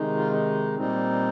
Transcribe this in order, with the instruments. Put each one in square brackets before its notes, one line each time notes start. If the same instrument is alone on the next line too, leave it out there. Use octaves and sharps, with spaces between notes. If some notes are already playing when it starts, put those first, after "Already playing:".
Already playing: [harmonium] C3 D#3 G#3 D#4
F4
D#4
A#2 G3 C4 D#4